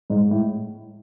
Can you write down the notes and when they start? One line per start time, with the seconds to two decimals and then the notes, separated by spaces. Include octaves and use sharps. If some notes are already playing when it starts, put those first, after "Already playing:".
0.10 G#2
0.31 A2